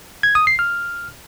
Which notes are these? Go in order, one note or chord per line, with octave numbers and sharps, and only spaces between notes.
G#6
D#6
C7
F6